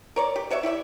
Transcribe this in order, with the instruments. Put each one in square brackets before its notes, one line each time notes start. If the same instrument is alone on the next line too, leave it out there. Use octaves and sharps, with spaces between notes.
[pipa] A#4 C#5 D5
G4
F#4 C#5 D5 E5
E4 G4 D5 E5